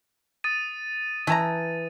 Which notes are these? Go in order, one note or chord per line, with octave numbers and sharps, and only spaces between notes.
D#6 A6 D#7
E3 A3 A5 A#5